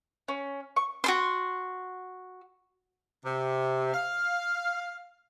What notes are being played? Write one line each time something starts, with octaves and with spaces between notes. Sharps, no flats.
C#4
C#6
F#4 A4 C6
C3
F5